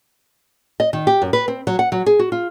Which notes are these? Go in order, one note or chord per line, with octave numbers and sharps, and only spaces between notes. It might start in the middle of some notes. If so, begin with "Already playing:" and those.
D#5
D#3
G4
F#2
B4
C4
F#3
F#5
F#3
G#4
F#4
F4